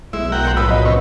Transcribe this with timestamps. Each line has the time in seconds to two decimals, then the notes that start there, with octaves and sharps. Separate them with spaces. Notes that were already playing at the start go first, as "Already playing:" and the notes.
0.13 B1 G#3 E4
0.32 F#4 A#4 G5
0.45 A4 C6
0.57 A2 F3 F#3 B4 E6
0.70 D#5
0.85 C3 C#4